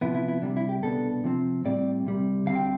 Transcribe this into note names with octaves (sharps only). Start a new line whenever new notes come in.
C3 F3 B3 E4
E4
E4
C2 C3 G3 D4
E4
G4
C2 B2 B3 D4 A4
C3 F3 C4
A2 G3 C4 D5
C2 C3 G3
D2 D3 G3 C4 F5
G5